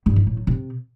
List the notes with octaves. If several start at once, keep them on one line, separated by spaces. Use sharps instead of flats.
G2
E3
A2
F#3
C3